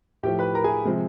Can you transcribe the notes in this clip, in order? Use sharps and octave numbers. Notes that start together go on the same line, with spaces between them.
A2 F3 A3 G4 G5
B4 B5
A#4 A#5
G#4 G#5
C3 F3 G#3